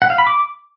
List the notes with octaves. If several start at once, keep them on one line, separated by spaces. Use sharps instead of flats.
F#5
F5
B5
D6